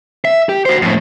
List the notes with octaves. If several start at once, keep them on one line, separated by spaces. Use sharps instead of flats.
E5
G4
F#4 C5
F2 A2